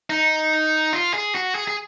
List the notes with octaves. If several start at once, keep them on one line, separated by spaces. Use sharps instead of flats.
D#4
F4
G#4
F#4
G#4
G#4